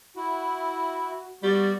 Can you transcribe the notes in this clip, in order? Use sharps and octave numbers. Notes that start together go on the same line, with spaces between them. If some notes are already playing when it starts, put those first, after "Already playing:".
E4 F#4
G3 B3 F#4 D5